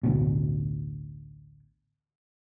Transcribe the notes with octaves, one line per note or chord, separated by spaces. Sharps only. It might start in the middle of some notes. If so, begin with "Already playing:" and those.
A1 D2 B2